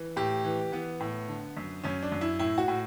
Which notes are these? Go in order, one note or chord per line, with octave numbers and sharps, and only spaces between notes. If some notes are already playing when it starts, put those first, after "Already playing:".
Already playing: E3
A2 G4
E3
E3 B3
A2
D3
F#2
F#2 C#4
D4
F#2
E4
A2 E4
F#4
A2